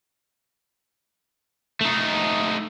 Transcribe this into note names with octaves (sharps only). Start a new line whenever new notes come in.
A3 D#4